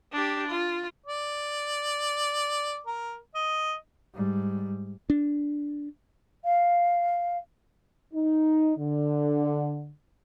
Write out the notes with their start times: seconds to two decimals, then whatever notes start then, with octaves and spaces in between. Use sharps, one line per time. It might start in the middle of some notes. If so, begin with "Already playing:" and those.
0.12 D4 G4
0.48 F4
1.06 D5
2.87 A#4
3.35 D#5
4.15 G#2 G3
5.10 D4
6.44 F5
8.13 D#4
8.78 D3